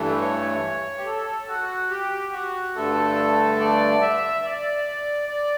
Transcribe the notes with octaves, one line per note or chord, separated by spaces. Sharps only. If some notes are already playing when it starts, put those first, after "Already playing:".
Already playing: G2 E3 A3
C#5
G4
A4
F#4
G4
F#4
G2 D3 A3 A4
D5
E5
D5
D5